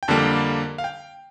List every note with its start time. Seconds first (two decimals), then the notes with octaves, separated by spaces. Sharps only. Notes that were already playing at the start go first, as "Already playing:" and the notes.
0.03 G5
0.08 F2 D3 G3 A#3 A5
0.78 F5
0.84 G5